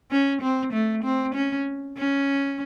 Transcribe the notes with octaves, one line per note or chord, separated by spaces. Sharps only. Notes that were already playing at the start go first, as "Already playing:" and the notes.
C#4
C4
A3
C4
C#4
C#4